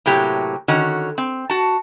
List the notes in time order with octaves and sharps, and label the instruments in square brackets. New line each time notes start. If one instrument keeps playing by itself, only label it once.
[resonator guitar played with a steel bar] A2 C3 F#3 A#3 G4
D3 D#3 C#4 F#4
C4
F#4 A5